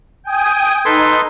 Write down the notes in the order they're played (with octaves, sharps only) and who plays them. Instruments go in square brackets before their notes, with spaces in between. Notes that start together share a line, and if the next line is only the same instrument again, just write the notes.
[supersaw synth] G5 G#5 D#6
[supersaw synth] D#4 [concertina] A4 B4 C6